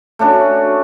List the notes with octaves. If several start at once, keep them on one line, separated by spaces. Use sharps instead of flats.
A3 C#4 D4 F#4